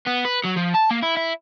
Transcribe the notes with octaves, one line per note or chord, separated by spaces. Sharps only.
B3
B4
F#3
F3
A5
A#3
E4
E4